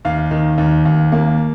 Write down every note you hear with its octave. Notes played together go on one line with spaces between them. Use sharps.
D#2 F5
D#3
D#2
D#2
A#3